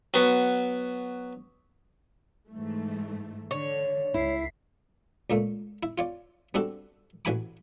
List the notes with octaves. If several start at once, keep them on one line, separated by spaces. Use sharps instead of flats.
F#3 B3 F#4
G#2 E3 A3
D3 C#5
C#2 E4 B6 C7
C#2 A#2 A3
E4
F4 C#5 D5
G3 C4 D4 F#4 A4
A1 E3 F#4 G#5 B5 D6